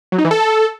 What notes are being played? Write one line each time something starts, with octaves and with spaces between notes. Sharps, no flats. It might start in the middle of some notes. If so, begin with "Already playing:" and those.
F#3
D#4
E3
A4